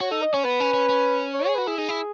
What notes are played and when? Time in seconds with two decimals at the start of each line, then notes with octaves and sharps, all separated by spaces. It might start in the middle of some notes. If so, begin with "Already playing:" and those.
0.01 F#4 C#5
0.11 D#4 A4
0.22 D#5
0.34 C#4 C#5
0.44 B3 B4
0.60 C#4
0.74 C#4
0.89 C#4
1.33 C#5
1.45 G#4 C#5
1.55 F#4 B4
1.67 E4 G#4
1.78 D#4 G#4
1.89 E4